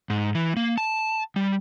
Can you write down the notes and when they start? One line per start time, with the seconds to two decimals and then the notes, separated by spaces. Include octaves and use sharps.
0.10 G#2
0.35 E3
0.56 A#3
0.78 A5
1.36 G3